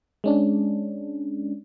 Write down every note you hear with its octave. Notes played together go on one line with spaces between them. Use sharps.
G#3 C#4 D4